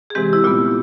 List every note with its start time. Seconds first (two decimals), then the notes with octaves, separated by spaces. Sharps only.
0.10 G#4
0.15 C3 E3 G#3 C4 G4
0.33 E4
0.44 A#2 G3 B3 F4